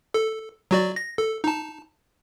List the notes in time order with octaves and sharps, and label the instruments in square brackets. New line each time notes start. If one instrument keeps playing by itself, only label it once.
[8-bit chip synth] A4
F#3 F#4 D5
A#6
A4
D#4 A5